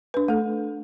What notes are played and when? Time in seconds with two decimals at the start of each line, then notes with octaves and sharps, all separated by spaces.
0.14 D4 B4
0.28 A3 A4